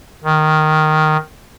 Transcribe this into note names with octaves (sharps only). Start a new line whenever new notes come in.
D#3